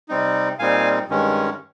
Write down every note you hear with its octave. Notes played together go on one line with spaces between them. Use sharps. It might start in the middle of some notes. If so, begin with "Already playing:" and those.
C3 G3 C4 D#4
A#2 G3 C4 D#4 F5 G#5
G2 D#3 G#3 C#4